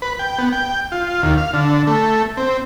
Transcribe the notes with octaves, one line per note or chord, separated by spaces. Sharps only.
B4
G5
B3
G5
F4
D#2
F5
D3
A3
C4